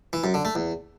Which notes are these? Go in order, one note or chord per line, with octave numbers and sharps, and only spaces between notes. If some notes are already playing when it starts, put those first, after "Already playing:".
E3
F#2
D3
A3
E2